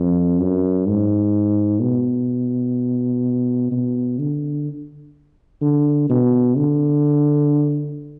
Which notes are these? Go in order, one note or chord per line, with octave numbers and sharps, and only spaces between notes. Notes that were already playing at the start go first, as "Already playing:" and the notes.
Already playing: F2
F#2
G#2
B2
B2
D3
D3
B2
D3